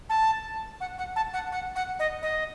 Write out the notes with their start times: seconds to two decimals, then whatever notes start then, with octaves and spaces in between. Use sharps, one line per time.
0.09 A5
0.80 F#5
0.98 F#5
1.16 A5
1.33 F#5
1.52 F#5
1.76 F#5
1.99 D#5
2.22 D#5